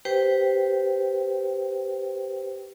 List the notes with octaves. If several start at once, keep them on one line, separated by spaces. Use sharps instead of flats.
G4 B4 C5 G5